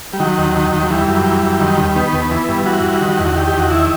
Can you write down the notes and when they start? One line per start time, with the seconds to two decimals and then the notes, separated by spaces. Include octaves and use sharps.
0.13 G3
0.20 D#3 F#3
0.38 D#2
0.55 D#3
0.73 D#2
0.82 F#3
0.91 E3 G3
1.08 F#2
1.25 E3
1.43 F#2
1.60 D#3
1.78 D#2
1.96 D#3 B3
2.13 D#2
2.31 E3
2.48 G2
2.66 E3 F#4
2.84 G2
3.01 D#3
3.18 E2
3.26 F#4
3.36 D#3 G4
3.47 G4
3.54 E2
3.59 F#4
3.71 D#3 E4